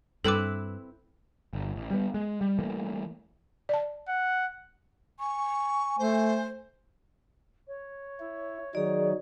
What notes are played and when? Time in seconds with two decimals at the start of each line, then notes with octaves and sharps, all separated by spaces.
0.24 G2 C4 E4 A4 B4 D6
1.53 G1
1.76 A1
1.91 G3 B3
2.14 G#3
2.41 G3
2.59 E3 G3 A3 A#3
3.69 D5 A5
4.08 F#5
5.19 G#5 C#6
5.99 A3 C5
7.68 C#5
8.20 E4
8.75 D#3 F#3 D#4 G#4 D5